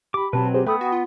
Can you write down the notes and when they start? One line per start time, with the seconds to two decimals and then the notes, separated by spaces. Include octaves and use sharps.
0.14 G4 B5 D6
0.33 B2 F#3 C4 B4 A5
0.54 G4 G#4 C5
0.66 A3 B3 A4 B4 G5 B5 D#6
0.81 F#4 F#5
0.92 F4